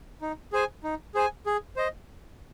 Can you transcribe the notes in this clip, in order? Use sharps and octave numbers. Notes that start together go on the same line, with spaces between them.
D#4
G#4 C5 G#5
D#4
G#4 C5 G#5
G#4
C5 D#5